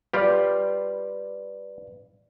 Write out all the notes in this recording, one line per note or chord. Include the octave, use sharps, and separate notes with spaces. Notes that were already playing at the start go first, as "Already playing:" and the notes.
G3 F4 G4 B4 D5